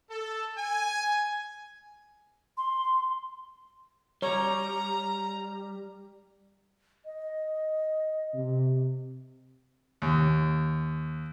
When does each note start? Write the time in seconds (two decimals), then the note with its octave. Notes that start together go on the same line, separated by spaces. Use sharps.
0.10 A4
0.58 G#5
2.58 C6
4.22 G3 C#5 A#5
7.06 D#5
8.34 C3
10.02 D#2